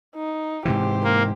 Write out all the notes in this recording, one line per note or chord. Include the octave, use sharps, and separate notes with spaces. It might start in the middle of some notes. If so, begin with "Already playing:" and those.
D#4
G#2 C3 E3 G4 C5
A#3